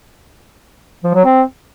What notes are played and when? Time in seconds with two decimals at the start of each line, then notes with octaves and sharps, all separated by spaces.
1.04 F3
1.14 F#3
1.25 C4